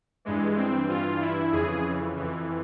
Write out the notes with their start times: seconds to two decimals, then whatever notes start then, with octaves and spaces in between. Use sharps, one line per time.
0.25 G2 E3 G#3
0.57 C4
0.89 G2 E3 F4
1.21 E4
1.53 F2 C#3 E3 G#4
2.16 F2 E3